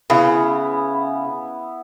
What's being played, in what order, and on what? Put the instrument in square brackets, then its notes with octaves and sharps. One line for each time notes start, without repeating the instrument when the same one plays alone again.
[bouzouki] C#3 [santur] B3 E4